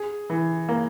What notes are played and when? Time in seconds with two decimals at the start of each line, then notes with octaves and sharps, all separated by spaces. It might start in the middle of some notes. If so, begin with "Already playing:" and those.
Already playing: G#4
0.30 E3
0.69 A#3